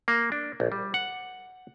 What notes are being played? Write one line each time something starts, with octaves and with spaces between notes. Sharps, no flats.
A#3
D4
A#1
G3
F#5